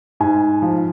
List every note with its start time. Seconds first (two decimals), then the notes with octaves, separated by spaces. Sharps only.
0.20 G#2 G#5
0.62 F3